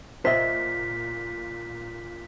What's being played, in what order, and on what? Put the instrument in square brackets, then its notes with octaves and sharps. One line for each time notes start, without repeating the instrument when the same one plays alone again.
[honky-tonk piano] A#2 [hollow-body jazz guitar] C5 D#5 E5 [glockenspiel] B6